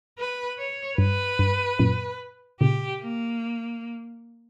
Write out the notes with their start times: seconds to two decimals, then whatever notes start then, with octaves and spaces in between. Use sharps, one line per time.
0.18 B4
0.58 C#5
0.98 G2 B4
1.39 G2
1.79 F#2 A#2
2.60 A#2 C#3 G4
3.01 A#3